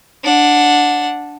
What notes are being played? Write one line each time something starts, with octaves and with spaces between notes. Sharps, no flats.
D4 F#5